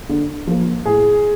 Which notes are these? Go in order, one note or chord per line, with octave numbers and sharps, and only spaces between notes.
D3
F3 A#3
A2 G#4